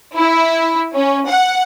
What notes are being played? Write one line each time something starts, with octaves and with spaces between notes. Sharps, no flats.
E4
C#4
F#5